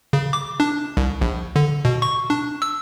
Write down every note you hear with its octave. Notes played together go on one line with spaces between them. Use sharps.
C#3
D6
D4
C2
A#1
D3
B2
C#6
D4
E6